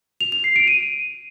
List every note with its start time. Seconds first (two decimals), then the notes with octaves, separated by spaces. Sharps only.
0.21 F7
0.32 F7
0.44 C7
0.56 D7
0.68 D#7